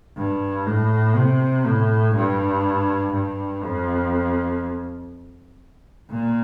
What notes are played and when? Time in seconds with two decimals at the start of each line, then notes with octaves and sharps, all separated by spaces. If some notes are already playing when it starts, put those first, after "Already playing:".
0.17 G2
0.67 A2
1.16 C3
1.65 A2
2.15 G2
3.14 G2
3.63 F2
6.10 A#2